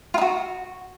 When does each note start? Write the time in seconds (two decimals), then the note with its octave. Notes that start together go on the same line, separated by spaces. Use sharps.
0.14 F4
0.18 D#4
0.21 F#4